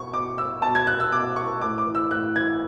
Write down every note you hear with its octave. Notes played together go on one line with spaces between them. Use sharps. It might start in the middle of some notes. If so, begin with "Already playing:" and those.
Already playing: B2 C#6
B2 D6
E6
B2 A5
G#6
F#6
E6
B2 D6
C#6
A2 D6
D6
E3
E6
A2 F#6
E3 G#6